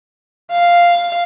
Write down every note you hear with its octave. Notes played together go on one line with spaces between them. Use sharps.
F5